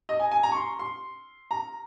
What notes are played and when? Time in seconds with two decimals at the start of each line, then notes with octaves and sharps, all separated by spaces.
0.09 D#5
0.20 G#5
0.31 G#5
0.43 A#5
0.52 C#6
0.56 C6
0.79 C6
1.51 A#5